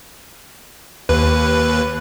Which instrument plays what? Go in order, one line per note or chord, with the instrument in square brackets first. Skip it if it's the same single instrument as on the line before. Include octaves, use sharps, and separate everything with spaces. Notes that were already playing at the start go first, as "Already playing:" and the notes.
[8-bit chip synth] D#2 B4